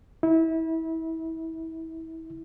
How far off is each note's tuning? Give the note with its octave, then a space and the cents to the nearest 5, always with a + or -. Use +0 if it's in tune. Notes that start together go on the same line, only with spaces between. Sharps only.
E4 -30